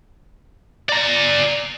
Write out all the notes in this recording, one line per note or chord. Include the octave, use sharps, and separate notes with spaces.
D5 A#5